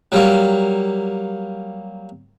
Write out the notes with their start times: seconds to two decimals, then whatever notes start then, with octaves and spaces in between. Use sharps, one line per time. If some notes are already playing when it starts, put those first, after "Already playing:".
0.12 F#3 G3 A#3